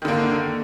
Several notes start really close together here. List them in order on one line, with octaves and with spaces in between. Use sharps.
D#3 D3 A#3